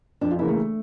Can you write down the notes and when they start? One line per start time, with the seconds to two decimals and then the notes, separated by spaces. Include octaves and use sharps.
0.21 F2 D4
0.31 F4
0.39 C#3 E3 A#3 E4
0.48 A3